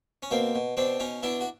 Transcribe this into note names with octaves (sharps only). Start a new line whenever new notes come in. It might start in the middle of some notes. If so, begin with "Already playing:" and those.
C#4
B2 A#3 C4
B2
B2 C4 D4
B2 C#4 D#4
B2 D4 E4
F#4